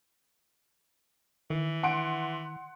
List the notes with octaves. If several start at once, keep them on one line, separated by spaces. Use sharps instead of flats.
D#3 E3
F#5 C6 D7